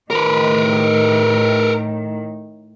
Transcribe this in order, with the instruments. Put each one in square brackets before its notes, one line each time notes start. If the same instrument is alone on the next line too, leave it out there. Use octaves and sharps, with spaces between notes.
[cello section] A2 D#3 [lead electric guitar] A#4 B4